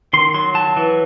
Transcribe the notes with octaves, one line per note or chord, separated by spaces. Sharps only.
D#3 C6
F#3 C6
F#3 A5
E3